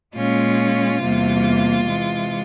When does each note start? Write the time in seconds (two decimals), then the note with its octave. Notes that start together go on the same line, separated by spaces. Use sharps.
0.15 A#2 G#3 C#4 F4
1.02 E2 C3 G3 A#3
1.88 C3 E3 G#3